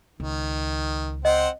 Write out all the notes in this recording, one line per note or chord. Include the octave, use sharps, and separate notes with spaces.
C#2 D#3
C4 C5 D#5 F#5